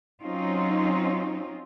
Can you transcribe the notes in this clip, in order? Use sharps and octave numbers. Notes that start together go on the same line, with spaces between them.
F#3 C4 C#4 D#4 F4